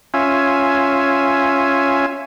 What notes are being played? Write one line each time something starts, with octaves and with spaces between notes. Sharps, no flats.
C#4 F4 E5 G#5